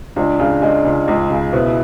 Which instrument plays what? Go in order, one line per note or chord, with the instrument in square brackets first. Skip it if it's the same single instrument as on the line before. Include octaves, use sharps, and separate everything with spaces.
[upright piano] C#2 [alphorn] D4
[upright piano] C#3
G#3
C#2
C#2
C#3
[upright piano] B2 [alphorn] E4